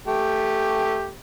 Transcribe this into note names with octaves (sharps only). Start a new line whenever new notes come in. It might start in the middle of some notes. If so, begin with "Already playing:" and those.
A3 G4